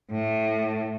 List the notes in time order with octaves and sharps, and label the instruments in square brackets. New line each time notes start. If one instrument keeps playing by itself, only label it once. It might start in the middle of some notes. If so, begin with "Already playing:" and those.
[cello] A2